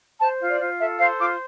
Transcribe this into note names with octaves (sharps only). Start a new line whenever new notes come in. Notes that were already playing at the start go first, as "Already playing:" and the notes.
C5 A5
F4
D5
F4
A4 E5
C5 F5
F4 D6